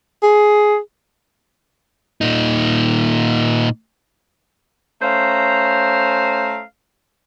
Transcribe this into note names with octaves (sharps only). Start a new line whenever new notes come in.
G#4
A#2 D#4
A3 C#4 C5 F5 A#5